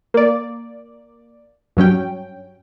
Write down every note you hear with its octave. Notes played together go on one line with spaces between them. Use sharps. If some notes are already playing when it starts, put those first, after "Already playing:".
A#3 D5
G2 F#3 C#4 G5